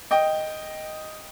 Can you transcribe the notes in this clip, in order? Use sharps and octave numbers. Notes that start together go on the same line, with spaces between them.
D#5 G5